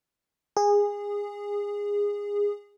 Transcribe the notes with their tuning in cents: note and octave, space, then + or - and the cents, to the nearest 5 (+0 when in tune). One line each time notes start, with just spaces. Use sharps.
G#4 -20